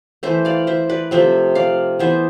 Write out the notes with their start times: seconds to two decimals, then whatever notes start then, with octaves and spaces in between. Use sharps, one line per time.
0.23 E3 A3 C5 E5
0.45 D5 F5
0.67 C5 E5
0.89 B4 D5
1.11 C3 F3 A3 C5 E5
1.55 D5 F5
1.99 E3 B3 C5 E5